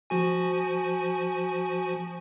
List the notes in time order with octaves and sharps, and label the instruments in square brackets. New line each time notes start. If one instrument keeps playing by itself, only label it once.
[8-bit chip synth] F3 F#4 G#5